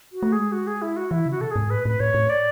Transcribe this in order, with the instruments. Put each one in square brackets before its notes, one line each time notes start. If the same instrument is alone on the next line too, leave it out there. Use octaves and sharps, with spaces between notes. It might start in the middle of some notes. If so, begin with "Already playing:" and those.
[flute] F#4
[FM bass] A3
[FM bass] G#3 [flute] G#4
[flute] F#4
G#4
E4
F#4
[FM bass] E3 [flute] E4
[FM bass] C#3 [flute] F#4
[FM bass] B2 [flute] A4
[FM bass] G#2 [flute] G#4
[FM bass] A2 [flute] B4
[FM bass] A2 [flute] B4
[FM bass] A2 [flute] C#5
[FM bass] A2
[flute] D5